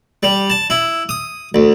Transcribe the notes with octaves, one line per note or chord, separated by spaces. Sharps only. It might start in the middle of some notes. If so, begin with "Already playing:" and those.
G3
A5
E4
D#6
D2